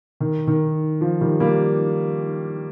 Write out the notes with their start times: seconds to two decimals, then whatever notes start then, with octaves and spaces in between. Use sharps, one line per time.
0.20 D#3
0.47 D#3
1.01 F3
1.21 D#3 G3
1.40 G3 A#3